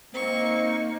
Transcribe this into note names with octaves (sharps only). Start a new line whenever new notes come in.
A#3 C4 D#4 C#6